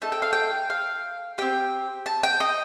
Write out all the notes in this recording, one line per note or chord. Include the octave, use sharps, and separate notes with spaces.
A3 D#4 A4 A5
G5
F5
G5
F5
C4 G4 G5
A5
G5
D#5